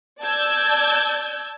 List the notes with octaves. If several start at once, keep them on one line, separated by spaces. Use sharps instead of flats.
D5 A5 E6 G6 G#6